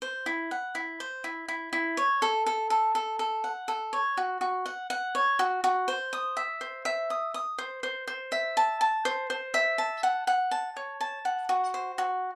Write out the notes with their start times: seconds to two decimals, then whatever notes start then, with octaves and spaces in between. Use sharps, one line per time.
0.02 C5
0.26 E4
0.51 F#5
0.75 E4
1.00 C5
1.24 E4
1.48 E4
1.73 E4
1.97 C#5
2.22 A4
2.46 A4
2.70 A4
2.95 A4
3.19 A4
3.44 F#5
3.68 A4
3.93 C#5
4.17 F#4
4.41 F#4
4.66 F#5
4.90 F#5
5.15 C#5
5.39 F#4
5.64 F#4
5.88 C5
6.13 D#6
6.37 E5
6.61 C5
6.85 E5
7.10 D#6
7.34 D#6
7.58 C5
7.83 C5
8.08 C5
8.32 E5
8.57 A5
8.81 A5
9.05 C5
9.30 C5
9.54 E5
9.78 A5
10.03 F#5
10.27 F#5
10.51 A5
10.77 C#5
11.01 A5
11.25 F#5
11.49 F#4
11.74 C5
11.98 F#4